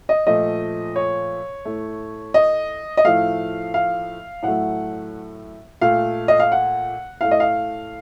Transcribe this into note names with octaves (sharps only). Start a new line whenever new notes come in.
D#5
A#2 F3 A3 D#5
C#5
A2 A3
D#5
D#5
A2 F3 A3 F5
F5
A2 F#3 A3 F#5
A#2 A3 F5
D#5
F5
F#5
A2 A3 F5
D#5
F5